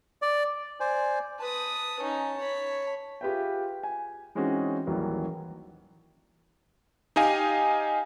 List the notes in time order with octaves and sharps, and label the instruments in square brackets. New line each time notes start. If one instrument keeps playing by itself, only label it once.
[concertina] D5
C5 D5 G#5
[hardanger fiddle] B4 D#6 [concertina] A5
[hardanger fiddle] C#4 D#4
C#5 B5
[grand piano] F4 G4 G#4 B4 E5 G5
G#5
E3 G#3 C4 C#4 D#4 F#4
A1 D#2 E3 F#3 G3
[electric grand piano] D#4 G4 D#5 F5 G#5